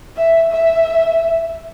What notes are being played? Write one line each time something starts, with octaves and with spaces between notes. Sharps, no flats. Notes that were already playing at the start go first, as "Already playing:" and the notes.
E5
E5